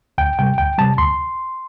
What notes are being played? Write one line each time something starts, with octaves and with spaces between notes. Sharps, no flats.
D2 G5
C3 G3 G5
D2 G5
C3 G3 A5
D2 C6